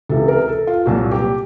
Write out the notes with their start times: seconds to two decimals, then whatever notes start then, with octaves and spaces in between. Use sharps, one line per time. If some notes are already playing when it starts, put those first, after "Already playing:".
0.09 C#2 C3 E3 A4
0.28 A#4
0.48 A4
0.67 F4
0.86 C2 A#2 F#3 F#4
1.11 G4